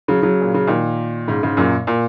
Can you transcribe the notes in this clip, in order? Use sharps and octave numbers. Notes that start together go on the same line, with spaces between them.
C#3 F#3
C#3 F#3
A#2
C#3
A#2 D#3
G#2 C#3
G#2 C#3
F#2 A#2
A#2